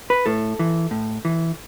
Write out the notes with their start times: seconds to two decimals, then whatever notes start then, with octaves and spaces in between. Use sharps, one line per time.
0.10 B4
0.26 A2 A4
0.59 E3
0.91 A2
1.25 E3